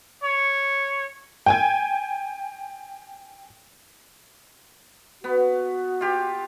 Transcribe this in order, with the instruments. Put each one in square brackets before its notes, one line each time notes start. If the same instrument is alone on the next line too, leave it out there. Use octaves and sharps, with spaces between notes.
[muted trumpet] C#5
[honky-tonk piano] G5 G#5 G#6
[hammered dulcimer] B3 [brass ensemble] F#4
[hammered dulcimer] F4 G4